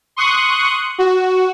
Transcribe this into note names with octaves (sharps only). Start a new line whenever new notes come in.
C6 C#6 D#6 F#6
F#4